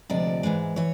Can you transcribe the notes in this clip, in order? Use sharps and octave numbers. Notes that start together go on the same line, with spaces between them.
D2 C3 F3 G#3 D5
G#2 E3 G#3
E3 C#5